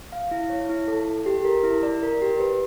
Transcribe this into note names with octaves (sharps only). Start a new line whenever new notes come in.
F5
E4
C#5
E4
A4
A4
G4
A#4
E4
D5
A#4
G4
B4